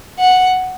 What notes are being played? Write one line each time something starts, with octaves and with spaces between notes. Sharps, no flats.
F#5